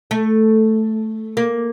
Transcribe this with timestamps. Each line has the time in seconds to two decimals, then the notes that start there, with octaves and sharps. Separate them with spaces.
0.11 A3
1.37 A#3